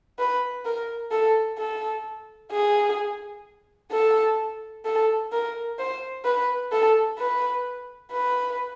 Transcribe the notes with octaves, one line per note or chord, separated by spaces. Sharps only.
B4
A#4
A4
A4
G#4
A4
A4
A#4
C5
B4
A4
B4
B4